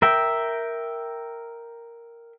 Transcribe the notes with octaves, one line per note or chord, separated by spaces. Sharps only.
A#4 E5 G5